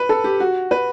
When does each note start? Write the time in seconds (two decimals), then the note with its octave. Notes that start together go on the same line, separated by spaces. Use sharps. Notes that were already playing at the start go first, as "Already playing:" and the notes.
Already playing: B4
0.09 A4
0.24 G4
0.40 F#4
0.71 B4